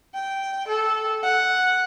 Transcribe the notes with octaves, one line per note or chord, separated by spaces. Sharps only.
G5
A4
F#5